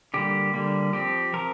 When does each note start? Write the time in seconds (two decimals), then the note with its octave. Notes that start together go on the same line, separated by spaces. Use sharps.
0.14 D3 G3 A#3 G4
0.54 D3 G3 A#3
0.93 F3 C4 G4
1.33 F3 C4 A#4